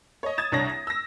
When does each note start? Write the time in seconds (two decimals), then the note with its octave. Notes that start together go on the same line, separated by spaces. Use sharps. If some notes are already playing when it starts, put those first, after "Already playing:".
0.23 C#5 D#5
0.38 D#6 G#6 A6 E7
0.52 C2 D4 C#5 D#6 A#6
0.70 A#6
0.87 E6 A#6